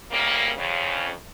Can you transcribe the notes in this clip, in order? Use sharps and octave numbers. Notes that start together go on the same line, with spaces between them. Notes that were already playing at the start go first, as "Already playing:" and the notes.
D2 C#3 G3 A#3
F2 C#3